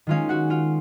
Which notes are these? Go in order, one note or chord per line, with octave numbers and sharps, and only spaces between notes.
D#3 G#3 C#4 F4 F5
F#4 F#5
F4 F5